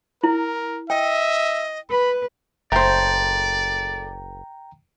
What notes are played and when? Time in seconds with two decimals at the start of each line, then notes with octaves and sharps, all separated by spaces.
0.23 E4 A#4
0.90 D#5 E5 G5
1.90 B4 B5
2.72 F#1 A3 C5 D5 G5 A#5